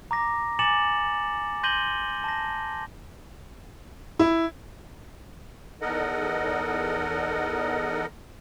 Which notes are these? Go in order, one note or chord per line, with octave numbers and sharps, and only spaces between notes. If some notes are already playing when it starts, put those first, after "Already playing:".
A#5 D6 A#6
G#5 D6 A6 C#7 E7 F#7
C6 G6 A#6 D#7 F#7 G7
A5 A#6
E4
E2 D#4 A4 A#4 D#5 F#5